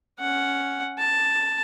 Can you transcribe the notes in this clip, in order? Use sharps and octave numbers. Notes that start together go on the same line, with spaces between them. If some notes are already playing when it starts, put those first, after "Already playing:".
C#4 F#5
A5